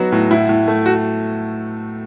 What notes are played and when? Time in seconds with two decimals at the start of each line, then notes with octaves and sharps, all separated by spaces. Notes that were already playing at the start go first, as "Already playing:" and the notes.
Already playing: F#3 B3 D#4 F#4
0.12 A2
0.30 A2 E4
0.49 A2
0.68 A3
0.86 F#4